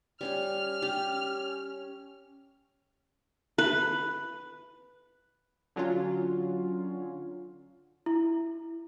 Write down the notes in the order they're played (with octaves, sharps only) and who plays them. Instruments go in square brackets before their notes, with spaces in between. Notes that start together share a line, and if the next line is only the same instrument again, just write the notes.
[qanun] G3 C#4 G4 [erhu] F6
[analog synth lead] C#4 [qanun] G4
[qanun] B4
[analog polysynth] D3 F#3 C#4 F4
[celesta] E4